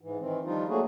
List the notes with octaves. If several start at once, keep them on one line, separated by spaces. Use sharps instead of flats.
G#2 E3
D#3 E3 C4
D#3 F3 G3 D4 D#4 F4
F#3 A3 A#3 D4 F#4 G#4